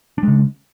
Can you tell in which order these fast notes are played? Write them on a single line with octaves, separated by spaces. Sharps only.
D4 G#3 C#3